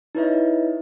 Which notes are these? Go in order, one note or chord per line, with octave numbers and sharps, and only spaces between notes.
D#4 E4 B4 C#5 D#5 E5